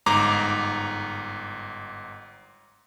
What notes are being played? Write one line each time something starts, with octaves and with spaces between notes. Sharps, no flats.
G1 G#2 A#5 D6